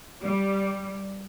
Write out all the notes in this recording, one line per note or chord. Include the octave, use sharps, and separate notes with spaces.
G3